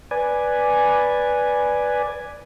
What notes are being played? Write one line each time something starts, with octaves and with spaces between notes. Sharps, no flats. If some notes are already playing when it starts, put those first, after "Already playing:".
B4 D5 G#5